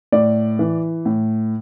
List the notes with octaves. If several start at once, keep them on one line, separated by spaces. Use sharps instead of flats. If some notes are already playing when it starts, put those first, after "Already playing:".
A2 D5
E3
A2